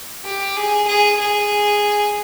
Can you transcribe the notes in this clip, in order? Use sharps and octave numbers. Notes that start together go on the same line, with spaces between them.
G4
G#4
G#4
G#4